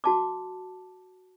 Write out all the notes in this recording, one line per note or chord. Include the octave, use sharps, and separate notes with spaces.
F#4 A5 D6